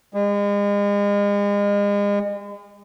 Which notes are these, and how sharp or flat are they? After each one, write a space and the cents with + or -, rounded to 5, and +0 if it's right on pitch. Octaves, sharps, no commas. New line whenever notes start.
G#3 -40